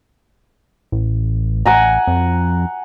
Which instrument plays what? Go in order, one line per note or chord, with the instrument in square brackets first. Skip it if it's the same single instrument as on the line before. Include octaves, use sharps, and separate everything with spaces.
[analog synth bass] A1
[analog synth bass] A1 [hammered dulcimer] F#5 G#5 A#5
[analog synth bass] F2